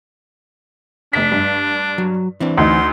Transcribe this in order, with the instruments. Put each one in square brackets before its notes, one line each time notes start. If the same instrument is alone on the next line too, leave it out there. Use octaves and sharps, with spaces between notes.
[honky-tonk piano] F1 B6 [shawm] D4
[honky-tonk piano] G2
[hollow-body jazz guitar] F#3
E3 C4 D4
[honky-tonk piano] D2 D#4 [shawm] C6